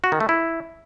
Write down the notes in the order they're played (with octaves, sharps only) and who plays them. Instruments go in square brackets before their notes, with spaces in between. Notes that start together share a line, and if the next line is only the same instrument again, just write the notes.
[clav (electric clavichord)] F#4
D#3
A3
E4